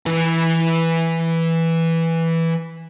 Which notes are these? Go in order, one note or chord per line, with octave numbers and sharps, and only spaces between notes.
E3 B4